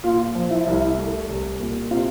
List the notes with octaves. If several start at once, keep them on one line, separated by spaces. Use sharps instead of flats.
A#2 F4
F3
E4
C2
A3
C2
A#2
C3 F4